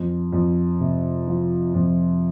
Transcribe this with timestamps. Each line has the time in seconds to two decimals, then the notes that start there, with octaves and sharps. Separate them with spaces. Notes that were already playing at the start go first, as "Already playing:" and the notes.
Already playing: F2
0.33 F2
0.80 C3
1.28 F3
1.74 F2